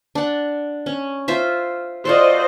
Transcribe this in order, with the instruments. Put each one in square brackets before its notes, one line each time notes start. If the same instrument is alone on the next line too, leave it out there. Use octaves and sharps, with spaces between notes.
[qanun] D4 F#5
C#4
F4 C5 E5
[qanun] F4 F#4 A4 [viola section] C5 D5 D#5